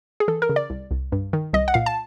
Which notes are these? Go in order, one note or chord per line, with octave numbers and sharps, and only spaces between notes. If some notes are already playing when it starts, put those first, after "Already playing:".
G#4
E3 A4
A#4
C#3
D5
C2
C2
G2
D#3
C2 D#5
F#5
A#2 F5
A5